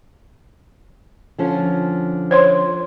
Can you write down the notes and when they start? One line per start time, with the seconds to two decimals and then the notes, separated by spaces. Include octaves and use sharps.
1.38 D3 F3 C#4
2.31 C5 C#5 C6